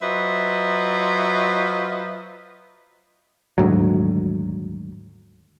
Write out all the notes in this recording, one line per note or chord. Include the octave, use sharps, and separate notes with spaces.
F#3 F4 B4 C5 D#5 E5
D#1 D2 G#2 F#3